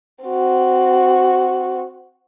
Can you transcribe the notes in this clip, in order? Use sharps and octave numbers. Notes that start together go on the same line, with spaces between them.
C4 F#4